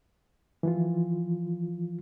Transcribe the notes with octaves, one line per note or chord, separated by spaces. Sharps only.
E3 F3 F4